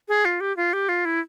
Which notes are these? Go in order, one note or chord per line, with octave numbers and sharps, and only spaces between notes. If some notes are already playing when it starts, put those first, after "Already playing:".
G#4
F4
G4
F4
G4
F4
E4